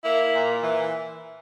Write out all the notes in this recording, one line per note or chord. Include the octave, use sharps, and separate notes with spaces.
A#3 E4
A#2
E3